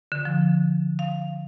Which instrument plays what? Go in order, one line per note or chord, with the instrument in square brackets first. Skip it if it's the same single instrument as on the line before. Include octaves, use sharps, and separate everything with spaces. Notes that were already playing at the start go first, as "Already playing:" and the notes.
[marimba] D3
F3
F5